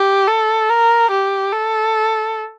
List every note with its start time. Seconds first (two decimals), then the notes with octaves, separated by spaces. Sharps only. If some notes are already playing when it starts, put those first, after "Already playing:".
Already playing: G4
0.27 A4
0.69 A#4
1.11 G4
1.52 A4